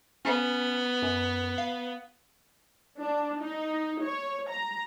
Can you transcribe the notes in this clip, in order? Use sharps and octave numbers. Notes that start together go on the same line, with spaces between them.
B3 C#4
F#2
F5
D4
D#4
C#5
A#5